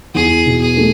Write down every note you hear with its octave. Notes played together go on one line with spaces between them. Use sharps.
E2 G#4
B2
G#4
A3